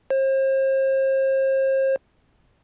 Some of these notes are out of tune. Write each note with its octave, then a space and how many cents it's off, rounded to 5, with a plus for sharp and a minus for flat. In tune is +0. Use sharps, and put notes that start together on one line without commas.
C5 +40